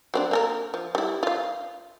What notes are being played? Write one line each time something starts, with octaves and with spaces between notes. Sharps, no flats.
F#3 C4 D4
A#3 A4 A#4
F3
G3 E4
F4 F5